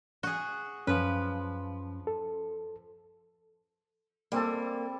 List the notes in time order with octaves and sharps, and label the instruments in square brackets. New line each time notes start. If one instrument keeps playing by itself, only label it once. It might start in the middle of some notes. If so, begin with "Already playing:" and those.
[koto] F#4 G#4
[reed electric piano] F#2 C#4 [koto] F3 B4
[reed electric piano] A4
[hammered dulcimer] G3 C4 A4 [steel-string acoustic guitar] A#3